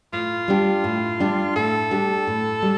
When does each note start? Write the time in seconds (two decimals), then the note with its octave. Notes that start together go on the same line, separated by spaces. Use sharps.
0.13 A2 F4
0.48 G3 D4 G4
0.84 A2
1.20 G3 D4 G4
1.56 A2 A4
1.91 G3 D4 G4
2.27 A2
2.62 G3 D4